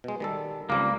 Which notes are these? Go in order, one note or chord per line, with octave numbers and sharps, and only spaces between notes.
B2 G#3
D#3 G3 A4
C#2 G3 A#3 C4